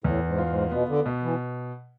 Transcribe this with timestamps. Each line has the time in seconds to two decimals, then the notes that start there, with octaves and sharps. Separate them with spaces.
0.04 E2 A2
0.27 G#2
0.38 F4
0.49 G#2
0.71 B2 B3
0.89 D3
1.06 B2
1.23 E3